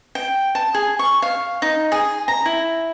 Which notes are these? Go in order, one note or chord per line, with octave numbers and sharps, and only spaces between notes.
G5
A5
G#4
C#6
F5
D#4
G#4
A#5
E4